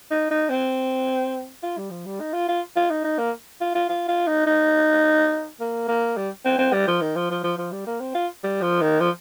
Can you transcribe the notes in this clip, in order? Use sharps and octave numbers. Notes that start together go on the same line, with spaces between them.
D#4
D#4
C4
F4
G3
F3
G3
D#4
F4
F4
F4
D#4
D#4
A#3
F4
F4
F4
F4
D#4
D#4
A#3
A#3
G3
C4
C4
G3
F3
D#3
F3
F3
F3
F3
G3
A#3
C4
F4
G3
F3
D#3
F3